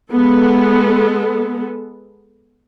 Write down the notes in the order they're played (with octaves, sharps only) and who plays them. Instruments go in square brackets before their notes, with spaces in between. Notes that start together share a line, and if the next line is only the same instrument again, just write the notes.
[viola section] G#3 B3 A4